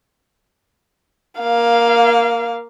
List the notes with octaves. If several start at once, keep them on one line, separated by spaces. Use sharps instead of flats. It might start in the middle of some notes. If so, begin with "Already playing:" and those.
A#3 F5